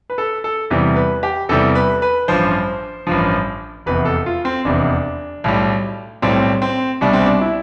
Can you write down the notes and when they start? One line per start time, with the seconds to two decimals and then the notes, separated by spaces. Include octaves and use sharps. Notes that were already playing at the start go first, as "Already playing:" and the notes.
0.10 B4
0.18 A4
0.44 A4
0.70 E2 C3 E3 G3
0.96 B4
1.23 G4
1.49 E2 C3 E3 G3 A4
1.75 B4
2.02 B4
2.28 A1 G2 F3 C5
3.07 A1 G2 F3
3.86 F1 E2 C3 B4
4.05 A4
4.26 F4
4.45 C4
4.65 F1 E2 C3 D4
5.44 B1 A2 G3
6.22 B1 A2 G3 C4
6.62 C4
7.01 C2 B2 G3 D4
7.13 C4
7.26 D4
7.41 E4